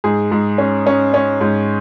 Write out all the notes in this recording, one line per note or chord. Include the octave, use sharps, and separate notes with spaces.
G#2 G#4
G#2
C#4
C#4
C#4
G#2